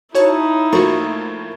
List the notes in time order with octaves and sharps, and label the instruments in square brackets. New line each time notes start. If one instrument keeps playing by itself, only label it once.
[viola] D#4 E4 [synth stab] F#4 C#5 A5
[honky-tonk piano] A2 F3 A#3 [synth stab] F#4 C#6